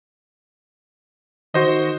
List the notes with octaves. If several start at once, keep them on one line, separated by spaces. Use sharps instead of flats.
D#3 F#4 C5 D#5